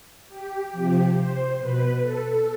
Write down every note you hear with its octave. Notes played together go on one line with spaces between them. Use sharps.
G4
C3 F3 G4
C5
B2 B4
A4